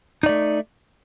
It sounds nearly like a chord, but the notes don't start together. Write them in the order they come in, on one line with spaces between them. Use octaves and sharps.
D#4 D5 A3